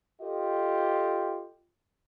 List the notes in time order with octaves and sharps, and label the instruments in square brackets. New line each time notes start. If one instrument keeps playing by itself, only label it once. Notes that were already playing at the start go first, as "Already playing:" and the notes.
[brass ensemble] F4 G4 A4 D#5